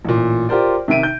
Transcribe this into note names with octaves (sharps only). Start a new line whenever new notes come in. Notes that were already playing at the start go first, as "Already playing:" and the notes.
A1 A#2
F4 G4 A#4 C5 D5
C3 D#3 E5 D7 D#7
G6